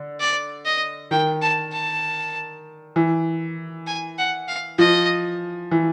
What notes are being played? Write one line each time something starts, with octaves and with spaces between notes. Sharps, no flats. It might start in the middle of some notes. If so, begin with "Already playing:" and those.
Already playing: D3
D5
D#5
D#3 G5
A5
A5
E3
G#5
F#5
F5
F3 D#5
E3